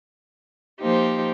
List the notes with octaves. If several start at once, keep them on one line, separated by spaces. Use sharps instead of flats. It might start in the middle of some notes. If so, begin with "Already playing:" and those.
F3 A#3 D#4 G4 C5